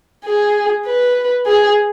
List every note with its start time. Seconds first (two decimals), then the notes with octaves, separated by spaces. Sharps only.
0.25 G#4
0.86 B4
1.46 G#4